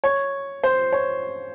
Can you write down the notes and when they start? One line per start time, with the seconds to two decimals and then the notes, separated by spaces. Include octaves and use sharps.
0.04 C#5
0.64 C5
0.92 C#5